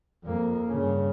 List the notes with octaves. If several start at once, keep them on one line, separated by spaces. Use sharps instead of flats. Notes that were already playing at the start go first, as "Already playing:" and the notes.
F2 A#3
G2 C#3